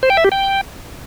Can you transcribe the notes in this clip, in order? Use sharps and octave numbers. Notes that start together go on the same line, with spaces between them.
C5
G5
E5
G4
G5